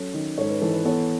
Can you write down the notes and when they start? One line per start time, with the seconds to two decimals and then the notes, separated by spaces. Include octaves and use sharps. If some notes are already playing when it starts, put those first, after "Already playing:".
Already playing: F#3 C#4 A4 C#5
0.14 D#3
0.38 G#2 A4 C#5
0.50 B4
0.62 E3 A4
0.73 B4
0.85 B3 A4 C#5